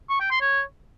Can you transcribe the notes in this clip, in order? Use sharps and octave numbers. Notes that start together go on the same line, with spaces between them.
C#6
G5
C6
C#5